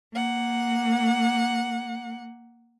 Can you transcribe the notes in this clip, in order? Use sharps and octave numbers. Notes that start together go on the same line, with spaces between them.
A#3 F#5